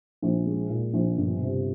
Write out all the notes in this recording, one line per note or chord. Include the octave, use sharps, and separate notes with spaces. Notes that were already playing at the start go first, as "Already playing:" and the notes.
A#1
G#3
A#2
A#1
G1
C3